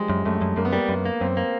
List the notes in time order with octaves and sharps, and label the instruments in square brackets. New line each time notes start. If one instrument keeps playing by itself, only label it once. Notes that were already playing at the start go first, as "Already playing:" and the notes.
Already playing: [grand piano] F3 G3 G#3
[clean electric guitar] F#2
[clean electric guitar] F#2 [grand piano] A3
[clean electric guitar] F#2
[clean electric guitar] F#2 [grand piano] A#3
[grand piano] B3
[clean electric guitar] G3 [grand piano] A#3
[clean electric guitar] F#2 [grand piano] B3
[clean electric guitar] A#3
[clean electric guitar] F#2 [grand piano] C4
[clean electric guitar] A#3